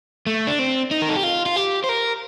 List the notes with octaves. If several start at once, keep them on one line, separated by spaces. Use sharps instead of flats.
A3
D4
C4
D#4
A#4
A4
G4
F4
F4
G4
C5
A#4